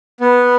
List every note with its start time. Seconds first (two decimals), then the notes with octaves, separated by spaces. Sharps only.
0.20 B3